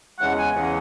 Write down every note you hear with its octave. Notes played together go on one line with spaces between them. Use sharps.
E2 C#3 E3 G#3 F#5
G#5
E2 C#3 E3 G#3 F#5